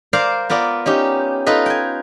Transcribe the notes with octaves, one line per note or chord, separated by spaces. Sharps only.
A#4 C5 D5 F5
B3 F4 A#4 D5
C#4 D#4 G4
D#4 F4 A4 B4 D#5
G5 G#5